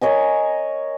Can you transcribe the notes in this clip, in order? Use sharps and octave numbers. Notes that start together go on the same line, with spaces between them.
A#4 C#5 D#5 G#5